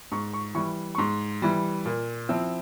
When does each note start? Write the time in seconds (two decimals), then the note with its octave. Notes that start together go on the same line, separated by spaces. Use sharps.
0.12 G#2 C#6
0.34 C#6
0.55 E3 G3 C#6
0.95 C#6
0.98 G#2 C6
1.42 E3 G3
1.85 A#2
2.29 F3 C4 E4